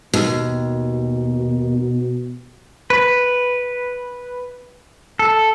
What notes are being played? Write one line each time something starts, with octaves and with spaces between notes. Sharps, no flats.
D#2 B2
B4
A4